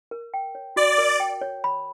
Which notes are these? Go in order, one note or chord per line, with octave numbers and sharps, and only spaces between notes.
A#4
G5
C#5
F#4 D5
A#4
G5
C#5
B5